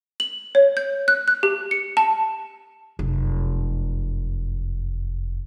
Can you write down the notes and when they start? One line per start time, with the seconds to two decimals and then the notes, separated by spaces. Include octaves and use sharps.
0.20 F#7
0.55 C#5
0.77 G6
1.08 F#6
1.28 F#6
1.43 G4
1.71 C#7
1.97 A5
2.99 F1 F#2